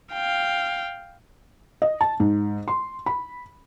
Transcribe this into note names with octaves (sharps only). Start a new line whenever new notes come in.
F5 G5
D#5
A5
G#2
C6
B5